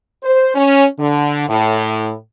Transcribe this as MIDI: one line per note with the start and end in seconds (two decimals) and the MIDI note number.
0.23 0.50 72
0.54 0.85 61
0.97 1.46 50
1.48 2.12 45